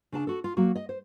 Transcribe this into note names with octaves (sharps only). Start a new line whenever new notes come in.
C#3 D4 A5
F#4 A4
F4
F#3 A#3 F#4
D#5
C5